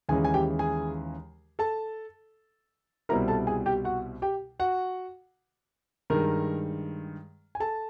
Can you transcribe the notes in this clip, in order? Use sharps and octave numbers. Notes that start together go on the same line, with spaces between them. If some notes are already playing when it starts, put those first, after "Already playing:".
D#2 C#3 E3 G#3 C#4 G#4 G#5
G#5
G4 G5
G#4 G#5
A4 A5
C2 B2 G3 C4 E4 A#4 A#5
A4 A5
G#4 G#5
G4 G5
F#4 F#5
G4 G5
F#4 F#5
G2 D#3 G#3 A#4 A#5
G#5
A4 A5